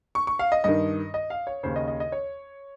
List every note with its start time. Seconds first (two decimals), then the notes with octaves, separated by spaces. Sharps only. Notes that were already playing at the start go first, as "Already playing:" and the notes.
0.15 C#6
0.27 C#6
0.39 F5
0.52 D#5
0.64 G2 D#3 D#5
1.14 D#5
1.30 F5
1.47 C#5
1.63 D#2 C#3 C5
1.76 D#5
1.88 D#5
2.00 D#5
2.12 C#5